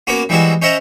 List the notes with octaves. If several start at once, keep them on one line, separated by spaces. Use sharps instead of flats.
A#3 B3 C#4 F#4 D6
E3 G3 G#3 C4 E4 F#4
C#4 C5 D#5 E5 F#5 A#5